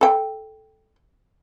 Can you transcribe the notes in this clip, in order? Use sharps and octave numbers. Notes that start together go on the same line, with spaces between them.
A4 G5